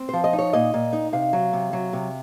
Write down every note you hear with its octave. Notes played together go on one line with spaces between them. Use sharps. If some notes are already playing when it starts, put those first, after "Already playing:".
Already playing: C4
F3 C5
D#5
D#4
C#5
A#2 D#5
A#2
D#4
C3 F5
F#3
C3
F#3
C3